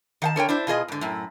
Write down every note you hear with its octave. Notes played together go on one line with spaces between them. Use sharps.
D#3 F#5 A5
D3 A#4 C#5 G5
D4 E4 C5
B2 F4 G#4 D#5
G#2 D3
F#2 A2